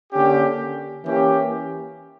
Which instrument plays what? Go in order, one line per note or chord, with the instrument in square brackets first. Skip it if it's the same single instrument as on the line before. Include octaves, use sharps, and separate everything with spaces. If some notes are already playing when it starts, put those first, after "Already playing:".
[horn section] D3 A#3 C#4 G4
E3 A#3 C#4 G4